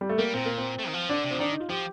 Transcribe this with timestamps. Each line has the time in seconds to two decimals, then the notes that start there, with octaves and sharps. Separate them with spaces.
0.01 G3
0.09 A3
0.18 G3 A#3
0.33 A#2 C4
0.46 A#3
0.58 C4
0.79 A3
0.88 D#3
0.94 F3
1.09 D3 D4
1.24 C3
1.31 F3 C4
1.40 D#3 D4
1.50 D#4
1.60 F4
1.70 F3 G4